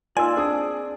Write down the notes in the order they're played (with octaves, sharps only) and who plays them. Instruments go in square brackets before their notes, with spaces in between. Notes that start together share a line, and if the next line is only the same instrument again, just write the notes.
[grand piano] A#3 D#4 [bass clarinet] F4 [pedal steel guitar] D5 E6 [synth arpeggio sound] G#5
[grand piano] C4 G#4 D#6 [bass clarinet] D4